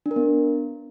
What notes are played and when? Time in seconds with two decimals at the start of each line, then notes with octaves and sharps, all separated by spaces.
0.06 D4
0.11 A#4
0.16 B3